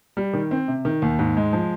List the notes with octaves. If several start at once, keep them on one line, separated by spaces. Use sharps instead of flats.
G3
D#3
C4
C3
D#3
D#2
G#2
G#3
F3